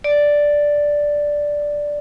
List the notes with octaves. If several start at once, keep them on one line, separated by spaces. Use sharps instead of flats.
D5